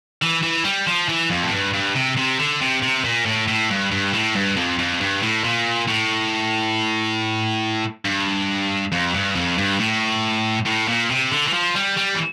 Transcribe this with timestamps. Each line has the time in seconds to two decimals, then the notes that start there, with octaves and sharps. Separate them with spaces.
0.22 E3
0.43 E3
0.64 G3
0.87 F3
1.08 E3
1.30 F2
1.43 A2
1.52 G2
1.74 G2
1.95 C3
2.17 C3
2.39 D3
2.61 C3
2.82 C3
3.05 A#2
3.26 A2
3.48 A2
3.70 G2
3.91 G2
4.14 A2
4.35 G2
4.56 F2
4.79 F2
5.00 G2
5.22 A2
5.44 A#2
5.88 A2
8.05 G2
8.92 F2
9.14 G2
9.35 F2
9.58 G2
9.79 A2
10.66 A2
10.88 A#2
11.10 C3
11.31 D3
11.47 E3
11.53 F3
11.75 G3
11.97 G3
12.15 E3